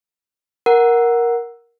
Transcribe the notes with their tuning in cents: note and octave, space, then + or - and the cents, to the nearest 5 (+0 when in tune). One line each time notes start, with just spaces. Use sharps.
A#4 +10 F#5 +0